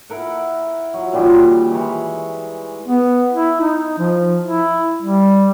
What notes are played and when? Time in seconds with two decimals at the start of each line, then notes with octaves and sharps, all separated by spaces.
0.10 E4 A#4 F#5
0.94 F#3
1.13 A#2 D#3 F3 G3
1.70 E3 G#3 C#5 B5
2.86 B3
3.34 E4
3.61 D#4
3.99 F3
4.43 E4
5.03 G3